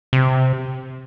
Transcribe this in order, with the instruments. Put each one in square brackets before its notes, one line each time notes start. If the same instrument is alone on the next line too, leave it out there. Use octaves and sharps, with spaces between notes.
[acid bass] C3